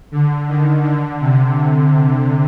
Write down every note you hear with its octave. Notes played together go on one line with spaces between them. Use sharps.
D3
D#3
D3
C3